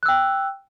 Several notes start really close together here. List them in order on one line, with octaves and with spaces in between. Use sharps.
F#6 E6 G5